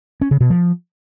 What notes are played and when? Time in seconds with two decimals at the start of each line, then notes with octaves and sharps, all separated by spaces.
0.21 C#4
0.31 C#3
0.41 B2
0.50 F3